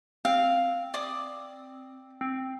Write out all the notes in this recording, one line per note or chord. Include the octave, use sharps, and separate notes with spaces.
C4 F5
D5 D6 D#6
C4